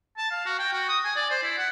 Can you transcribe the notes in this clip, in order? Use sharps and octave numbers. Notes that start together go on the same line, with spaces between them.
A5
F5
F#4
G5
F#4
D#6
G#5
D5
C5
E4
F#5